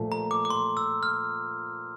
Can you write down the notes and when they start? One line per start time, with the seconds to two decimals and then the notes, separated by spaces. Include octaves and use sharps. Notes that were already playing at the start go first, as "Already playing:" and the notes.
Already playing: A#2 F3 A3
0.12 A#5
0.31 D6
0.45 D6
0.50 C6
0.77 E6
1.03 F6